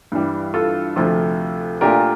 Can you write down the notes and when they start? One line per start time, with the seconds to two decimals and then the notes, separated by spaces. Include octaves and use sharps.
0.12 G2 E3 G3
0.54 F4 A4
0.96 D2 C3 F3 F4 A4
1.81 A#2 A3 D4 F4 G4 A#4